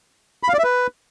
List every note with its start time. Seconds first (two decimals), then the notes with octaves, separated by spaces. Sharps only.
0.43 B5
0.49 F5
0.54 D5
0.59 E5
0.64 B4